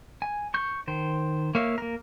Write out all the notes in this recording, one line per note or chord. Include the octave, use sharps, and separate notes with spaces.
G#5
C#6 G6
D#3 C5
A#3 C#5 E5 F5
A#3 A#4